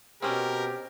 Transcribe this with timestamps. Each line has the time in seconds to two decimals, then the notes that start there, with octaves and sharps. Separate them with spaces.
0.22 B2 C4 C#4 G4 A#4